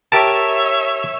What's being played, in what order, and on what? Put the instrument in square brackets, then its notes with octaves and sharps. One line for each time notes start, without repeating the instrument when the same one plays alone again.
[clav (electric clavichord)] G4 A#4 A5 [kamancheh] C#5 E5